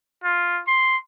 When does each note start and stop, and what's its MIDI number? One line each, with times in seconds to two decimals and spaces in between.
0.24 0.61 65
0.67 0.97 84